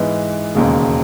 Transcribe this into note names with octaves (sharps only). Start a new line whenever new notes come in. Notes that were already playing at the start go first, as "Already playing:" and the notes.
Already playing: G#2 E3 B3
E1 D#2 C#3 G#3